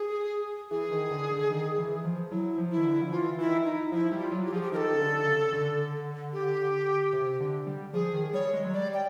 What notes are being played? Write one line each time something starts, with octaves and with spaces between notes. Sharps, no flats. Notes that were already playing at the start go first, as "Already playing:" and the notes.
Already playing: G#4
E3 G#4
D#3
D3
D3
D#3
E3
F3
F#3 E4
F3
E4
D#3
D3
F3
E3 F4
E3 E4
D#3
E3
D#4
F3 E4
G3
F4
F#3
G4
F3 G#4
G4
D#3 A4 A#4
C#3
D3
C#3
D3
G4
C3
D3
G3
F3 G#4
D#3
G3 C#5
G#3
F#3
G3 D5
G5